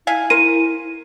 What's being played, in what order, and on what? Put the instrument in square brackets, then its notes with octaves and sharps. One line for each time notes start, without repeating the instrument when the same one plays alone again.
[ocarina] E4 [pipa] E5 F5 G#5
[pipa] A#4 C5 [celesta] D#7